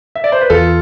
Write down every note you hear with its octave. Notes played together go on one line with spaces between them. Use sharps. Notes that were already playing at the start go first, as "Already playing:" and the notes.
E5
D5
C5
B4
E2 F4 A4